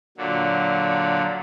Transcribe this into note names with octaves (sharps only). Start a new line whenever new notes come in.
A#2 D3 F#3